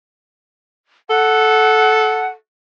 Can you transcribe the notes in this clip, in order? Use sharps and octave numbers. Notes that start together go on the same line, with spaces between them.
A4 F#5